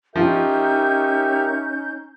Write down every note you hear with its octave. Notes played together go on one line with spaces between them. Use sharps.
F3 C#4 D#4 G4 A#4 E5 G6